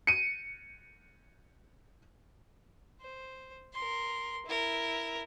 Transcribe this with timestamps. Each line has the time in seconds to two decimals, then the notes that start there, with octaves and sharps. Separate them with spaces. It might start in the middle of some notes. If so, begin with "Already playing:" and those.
0.07 C#7 D#7
3.01 C5
3.74 A#4 C6
4.46 E4 A#4